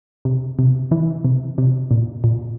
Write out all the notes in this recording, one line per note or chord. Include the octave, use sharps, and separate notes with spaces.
C3
C3
E3
C3
C3
A#2
A#2